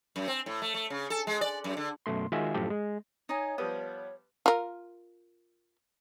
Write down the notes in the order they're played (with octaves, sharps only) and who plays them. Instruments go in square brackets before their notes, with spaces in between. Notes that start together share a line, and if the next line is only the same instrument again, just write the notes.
[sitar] F#2
C4
A2
A3
A3
C#3
A4
G#3
D5
F#2
D3
[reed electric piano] F#2 B2 A3 C6
D#3 G#3 F4 F#4 E5 G#5
F#2 A2 F3 G4 A4
G#3
[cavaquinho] D#4 D#5 G#5 [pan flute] C#5
[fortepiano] F3 G3 B3 [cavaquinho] D#6
[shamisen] F4 A#4